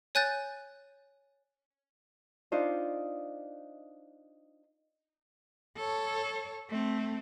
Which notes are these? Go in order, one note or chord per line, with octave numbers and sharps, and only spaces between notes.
C#5 G#5 F#6 G6 A6
D4 D#4 F4 C5
A4 C#5
A3 C4